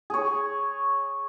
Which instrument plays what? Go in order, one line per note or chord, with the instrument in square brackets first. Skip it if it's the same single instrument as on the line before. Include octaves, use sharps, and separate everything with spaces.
[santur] G#4 C#5